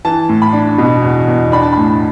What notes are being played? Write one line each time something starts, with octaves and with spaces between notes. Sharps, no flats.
E3 A5
A2
B5
D4
B2
E2
E2
D4 B5
A5
A2 B5